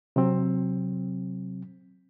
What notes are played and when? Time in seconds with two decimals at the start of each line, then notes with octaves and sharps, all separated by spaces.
0.16 C3 F#3 C4